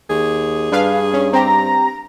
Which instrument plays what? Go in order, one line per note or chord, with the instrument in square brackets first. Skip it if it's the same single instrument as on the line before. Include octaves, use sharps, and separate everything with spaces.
[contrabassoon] D#2 [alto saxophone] G#4
[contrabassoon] G2 [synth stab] D4 B4 F5
[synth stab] C#4
[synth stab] C4 G4 [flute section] A#5